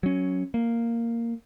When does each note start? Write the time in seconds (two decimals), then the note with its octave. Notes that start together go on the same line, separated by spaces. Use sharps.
0.03 F#3 C#4
0.54 A#3